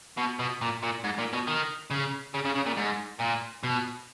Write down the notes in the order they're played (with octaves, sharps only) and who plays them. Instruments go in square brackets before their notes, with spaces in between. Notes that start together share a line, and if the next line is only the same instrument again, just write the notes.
[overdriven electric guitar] B2
B2
A#2
A#2
G#2
A#2
B2
D#3
C#3
C#3
C#3
C#3
A#2
G#2
A#2
B2